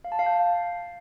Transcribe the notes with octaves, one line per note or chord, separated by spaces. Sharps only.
F5
A5
F5
G6